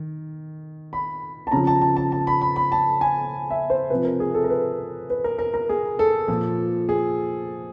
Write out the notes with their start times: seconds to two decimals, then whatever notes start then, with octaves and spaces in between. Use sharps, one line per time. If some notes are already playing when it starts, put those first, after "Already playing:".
Already playing: D#3
0.93 B5
1.47 A5
1.52 C#3 F3 A#5
1.67 A5
1.81 A5
1.97 A5
2.12 A5
2.27 B5
2.41 B5
2.56 B5
2.72 A5
3.01 G#5
3.51 E5
3.70 C5
3.90 C3 F3 B4
4.05 A#4
4.20 G#4
4.34 A4
4.44 A#4
4.50 B4
5.10 B4
5.24 A#4
5.39 A#4
5.54 A#4
5.69 G#4
5.99 A4
6.28 A#2 F3
6.89 G#4